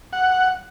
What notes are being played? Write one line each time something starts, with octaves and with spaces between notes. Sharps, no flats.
F#5